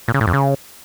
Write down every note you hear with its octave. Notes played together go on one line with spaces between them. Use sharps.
A#2
C#3
A2
F2
C#3